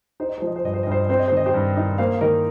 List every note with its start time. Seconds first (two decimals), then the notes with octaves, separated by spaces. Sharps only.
0.20 D#4 C5
0.29 D#5
0.38 F3 C5
0.47 D#5
0.56 C5
0.64 G2 D#5
0.74 C5
0.83 G2 D#5
0.92 C5
1.01 D#5
1.09 C4 C5
1.19 D#5
1.28 D#3 C5
1.37 D#5
1.46 G4 C5
1.54 G2
1.77 D#4
1.98 A#3 C5 F5
2.14 F5
2.21 D#3 A#4 D#5